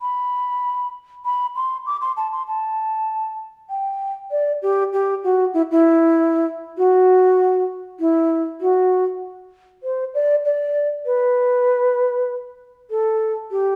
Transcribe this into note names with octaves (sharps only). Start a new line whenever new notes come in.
B5
B5
C6
D6
C6
A5
C6
A5
G5
D5
G4
G4
F#4
E4
E4
F#4
E4
F#4
C5
D5
D5
B4
A4
G4